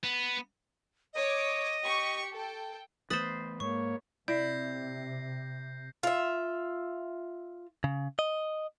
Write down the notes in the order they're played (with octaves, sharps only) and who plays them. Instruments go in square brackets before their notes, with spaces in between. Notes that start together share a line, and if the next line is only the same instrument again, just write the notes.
[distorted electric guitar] B3
[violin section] C#5 D6 [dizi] D#5
[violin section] G4 C#6
A4 G5
[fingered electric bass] E3 A3 B3 [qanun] B4 C5 [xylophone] D#6 A6
[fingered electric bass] G#2 G#3 [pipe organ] A#3 C#5 [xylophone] C#6
[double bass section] C3 [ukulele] E4 [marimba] D5 [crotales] G6 A#6 C7
[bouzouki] F4 E5
[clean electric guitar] C#3
D#5